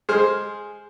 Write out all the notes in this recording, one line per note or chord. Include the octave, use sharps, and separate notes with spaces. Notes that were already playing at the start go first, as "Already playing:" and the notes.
G#3 G#4 C5 F6